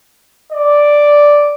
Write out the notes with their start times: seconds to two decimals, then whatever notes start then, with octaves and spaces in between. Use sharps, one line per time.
0.53 D5